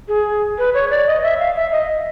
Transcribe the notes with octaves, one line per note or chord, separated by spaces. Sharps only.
G#4
B4
C#5
D5
D#5
E5
F5
E5
D#5